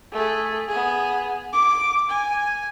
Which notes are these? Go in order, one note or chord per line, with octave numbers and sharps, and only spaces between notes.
A3 G#4
B3 G#4
D6
G#5